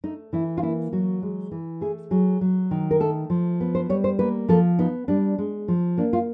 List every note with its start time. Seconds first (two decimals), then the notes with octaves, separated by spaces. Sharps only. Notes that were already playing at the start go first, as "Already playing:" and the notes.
0.04 A3 D#4
0.33 E3 E4
0.57 F4
0.62 A#3 E4
0.92 F#3 F#4
1.23 G#3
1.51 E3
1.81 A3 G#4
2.11 F#3 G#4
2.41 F#3
2.71 D#3
2.91 A#4
3.00 A3 A4
3.30 F3
3.61 B3
3.75 C5
3.89 G3 C#5
4.04 C5
4.19 A#3 B4
4.49 F3 A4
4.79 B3 D#4
5.08 G3 D4
5.38 G#3
5.68 F3
5.97 A#3 D4
6.13 F4